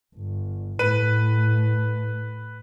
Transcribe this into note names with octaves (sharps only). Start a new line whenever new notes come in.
G1
A2 B4 D#7